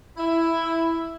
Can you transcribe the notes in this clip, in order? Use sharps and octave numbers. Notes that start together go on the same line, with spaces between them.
E4